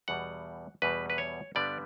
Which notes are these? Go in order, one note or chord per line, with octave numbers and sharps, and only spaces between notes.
E2 B2 G3 F#5
E2 B2 G3 B4
B4
C#5
G2 D3 G3 B3 D5